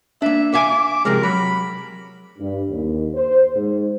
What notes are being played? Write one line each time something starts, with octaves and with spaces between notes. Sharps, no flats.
A#3 D4 E5
E5 F5 G#5 D6
D6
C3 F3 G#3 A#4
F#3 B5
G2
D#2
C5
G#2